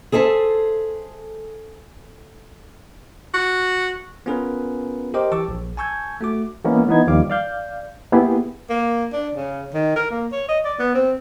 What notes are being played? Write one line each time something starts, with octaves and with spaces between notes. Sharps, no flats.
G#4 A4 C5 E5 A5
F#4
B3 C#4 F4 G#4 A#4 B4
G4 A#4 C5 D#5 G5 D6
E3 G4 A5 C#6 D6 E6
A#1
G#5 A5 C#6 E6 G6 G#6
A3 F#4 D6
E3 G#3 A#3 B3 C#4
E3 B3 D#4 G#6
D#2 D#3 F3 G3 F5 D6
D5 F5 G6
A#3 B3 E4 G4 G#4
A#3
D4
C#3
D#3
A#4
A#3
C#5
D#5
D5
B3
C4